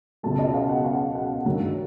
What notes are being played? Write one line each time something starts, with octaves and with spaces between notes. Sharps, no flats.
C#2 B2 F#3 A5
D#5
F5
F#5
F5
F#5
G2 D#3 F#3